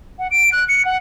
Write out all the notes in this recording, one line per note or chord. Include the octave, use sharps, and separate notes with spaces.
F#5
D7
F#6
C#7
F#5